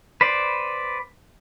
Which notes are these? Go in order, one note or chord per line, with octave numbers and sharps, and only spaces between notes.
B4 C5 D5